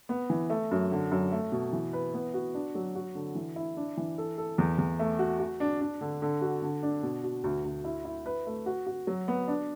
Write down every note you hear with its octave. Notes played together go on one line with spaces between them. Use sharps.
B3
E3
A3
F#2
D3
F#2
A3
B2
E3
B4
B3
F#4
D4
F#3
F#4
D3
E3
E4
D4
E3
A4
A4
E2
E2
A3
F#4
F#4
D4
D4
D3
D3
F#4
D3
D4
B2
F#4
D2
D2
E4
E4
B4
A3
F#4
F#4
F#3
B3
D4